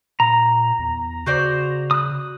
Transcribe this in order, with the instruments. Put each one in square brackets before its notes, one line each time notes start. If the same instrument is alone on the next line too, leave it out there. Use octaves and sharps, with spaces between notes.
[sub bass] A#2 [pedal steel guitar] A#5
[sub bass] E2
[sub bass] C#3 [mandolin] F#4 C5 D5
[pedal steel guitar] D#6 F#6